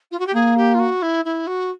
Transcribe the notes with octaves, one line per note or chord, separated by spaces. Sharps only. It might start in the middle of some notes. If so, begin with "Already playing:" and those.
F4
F#4
G4
A#3 G#4
G4
F4
F#4
E4
E4
F#4